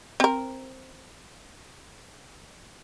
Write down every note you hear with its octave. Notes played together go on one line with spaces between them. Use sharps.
C4 A#4